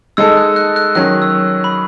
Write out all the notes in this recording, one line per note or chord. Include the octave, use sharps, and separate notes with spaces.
G#3 D#4 A4 E6
F#6
F#6
F#6
D#3 F#3 C#4 F#6
E6
B5